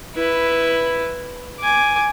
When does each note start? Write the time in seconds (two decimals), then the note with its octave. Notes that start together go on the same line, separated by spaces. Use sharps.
0.15 E4 B4
1.60 G#5 D6